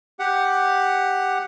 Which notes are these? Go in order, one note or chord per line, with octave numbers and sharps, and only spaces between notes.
G4 F#5